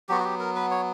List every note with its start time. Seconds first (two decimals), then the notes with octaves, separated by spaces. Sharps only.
0.09 F#3 B3 F#4 G4
0.20 F#4
0.24 G4
0.40 A#4
0.56 B4
0.71 C#5